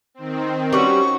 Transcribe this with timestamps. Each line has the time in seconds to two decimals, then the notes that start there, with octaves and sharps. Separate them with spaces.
0.14 D#3 C4
0.73 G3 C#4 F#4 B4 C#6